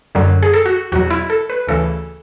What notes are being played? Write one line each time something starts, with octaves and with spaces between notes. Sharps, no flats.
F#2 D3 F#3
G#4
A4
F#4
E2 B2 F#3 F#4
E4
A4
B4
D2 C#3 E3 A4